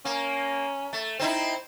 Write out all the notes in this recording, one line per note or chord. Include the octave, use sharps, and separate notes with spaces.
A#3 C#4
A3
C4 D#4 E4 C5